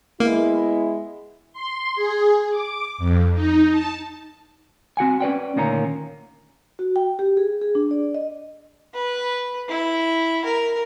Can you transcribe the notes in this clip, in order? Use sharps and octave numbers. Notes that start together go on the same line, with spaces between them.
G#3 A#3 B3 E4
C6
G#4
D6
F2
D#4
A5
C4 F#4 F#5 G#5
C#4 B4 D5 G5
D2 A#2 D#3 A#3 C#4 A#5
F#4
G5
G4
G#4
G#4
D4
D5
D#5
B4
E4
A#4